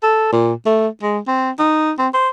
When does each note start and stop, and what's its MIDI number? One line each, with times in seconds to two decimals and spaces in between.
0.03 0.28 69
0.32 0.53 46
0.66 0.88 57
1.02 1.19 56
1.28 1.50 60
1.59 1.92 63
1.99 2.08 60
2.14 2.30 72